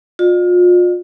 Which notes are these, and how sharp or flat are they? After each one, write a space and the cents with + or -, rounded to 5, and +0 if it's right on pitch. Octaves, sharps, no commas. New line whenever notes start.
F4 +35 D5 +45